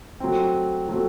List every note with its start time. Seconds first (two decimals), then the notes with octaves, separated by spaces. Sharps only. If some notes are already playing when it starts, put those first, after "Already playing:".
0.20 F#3 A3 C4
0.89 F#3 A3 C4